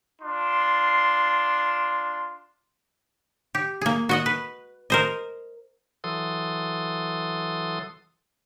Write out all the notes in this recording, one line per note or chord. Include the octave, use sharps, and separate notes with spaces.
D4 F4 C6
G4
A#3 G#4
F#4 D#5 F#5
B4
A#4 C5 D#5
E3 F#3 A4 C6 D#6